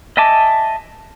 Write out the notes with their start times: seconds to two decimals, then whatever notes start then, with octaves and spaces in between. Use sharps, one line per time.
0.17 D#5 E5 G#5 A5 D6